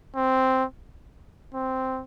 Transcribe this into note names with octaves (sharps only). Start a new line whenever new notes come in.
C4
C4